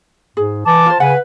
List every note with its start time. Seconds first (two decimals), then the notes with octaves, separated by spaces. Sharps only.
0.37 G#2 G#4
0.66 E3 A5 D6
0.86 F4 C5
1.00 C#3 B4 F#5 G#5